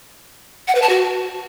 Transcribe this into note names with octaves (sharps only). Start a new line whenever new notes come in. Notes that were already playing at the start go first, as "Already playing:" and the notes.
F#5
B4
A5
F#4